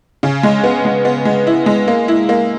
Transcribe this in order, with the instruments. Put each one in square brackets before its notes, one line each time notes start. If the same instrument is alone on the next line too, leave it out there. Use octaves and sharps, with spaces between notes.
[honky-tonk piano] C#3
G#3
B3
G#3
B3
G#3
E4
G#3
A#3
E4
A#3